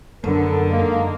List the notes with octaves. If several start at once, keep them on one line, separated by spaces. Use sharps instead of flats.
F#2 D3 B3 A4 A#4
D#3 G#3 A#3